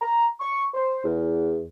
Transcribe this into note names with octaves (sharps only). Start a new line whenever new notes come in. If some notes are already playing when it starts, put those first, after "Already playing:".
A#5
C#6
C5
E2